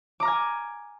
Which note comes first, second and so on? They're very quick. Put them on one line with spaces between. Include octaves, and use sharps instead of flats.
D6 A#5 F6 G#5